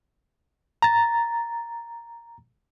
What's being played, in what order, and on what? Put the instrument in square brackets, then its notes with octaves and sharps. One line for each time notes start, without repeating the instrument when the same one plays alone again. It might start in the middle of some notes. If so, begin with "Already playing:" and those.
[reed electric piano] A#5 A6